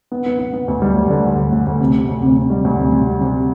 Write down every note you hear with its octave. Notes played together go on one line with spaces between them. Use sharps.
B3
B3
B3
B3
D2
G3
D2
D3
D2
D2
D2
D2
C3
C3
D2
C3
C3
G3
D2
C3
C3
G3
C3